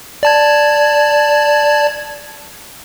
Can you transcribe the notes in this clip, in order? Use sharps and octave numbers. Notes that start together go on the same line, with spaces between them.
D5 A5 G#6